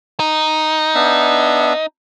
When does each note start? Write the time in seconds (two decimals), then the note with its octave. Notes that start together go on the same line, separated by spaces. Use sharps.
0.20 D#4
0.95 B3 D4 E5